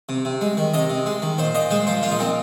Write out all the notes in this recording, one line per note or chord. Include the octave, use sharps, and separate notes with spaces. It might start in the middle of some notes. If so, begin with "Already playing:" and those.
C3
C3
G#3
D#3
C3 D#5
C3
G#3
D#3
A#2 C5
A#2 D#5
G#3 C5
F3 C5
A#2 F4
D#4
A#2 C4